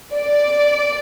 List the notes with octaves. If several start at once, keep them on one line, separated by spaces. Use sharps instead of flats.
D5